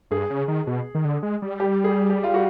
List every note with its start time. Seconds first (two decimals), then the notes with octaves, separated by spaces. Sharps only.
0.11 G2 G#4
0.30 C#3
0.48 D#3
0.67 B2
0.95 D#3
1.05 D3
1.23 G#3
1.42 G3
1.60 G4
1.84 G#4
2.10 G4
2.24 F4
2.34 F#4